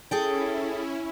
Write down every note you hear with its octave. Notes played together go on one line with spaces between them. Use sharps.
C#4 E4 G#4 A4 G5